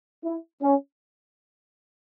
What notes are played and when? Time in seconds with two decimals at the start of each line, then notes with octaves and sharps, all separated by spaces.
0.24 E4
0.63 C#4